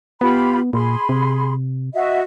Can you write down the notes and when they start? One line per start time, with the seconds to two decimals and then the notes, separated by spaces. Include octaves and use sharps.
0.21 B3 F4 G4 B5
0.73 A#2 G#4 B5 C6
1.09 C3
1.94 F#4 D#5 E5